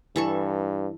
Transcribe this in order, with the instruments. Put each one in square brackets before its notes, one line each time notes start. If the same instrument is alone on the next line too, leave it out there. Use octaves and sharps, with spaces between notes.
[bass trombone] G2 [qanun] E3 A4 C#6